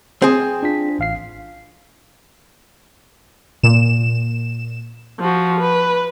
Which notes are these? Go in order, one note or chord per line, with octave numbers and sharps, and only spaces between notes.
C4 G#4
D4 F4 B6
A1 F5 C7
A#2 E7
F3 F#4
B4